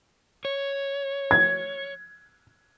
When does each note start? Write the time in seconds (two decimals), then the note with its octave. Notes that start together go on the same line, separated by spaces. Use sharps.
0.45 C#5
1.31 G#6